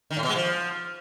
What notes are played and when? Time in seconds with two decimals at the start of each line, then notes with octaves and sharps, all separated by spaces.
0.10 D#3
0.17 A2
0.23 B2
0.29 G#3
0.35 F3